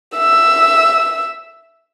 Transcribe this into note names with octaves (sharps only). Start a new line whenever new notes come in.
E5 E6